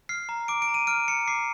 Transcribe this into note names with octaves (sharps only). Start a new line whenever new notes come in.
F6 C7
A#5
D6 D7
D7
A#5
D#7
F6 D7
A#5 C#7
D6 C7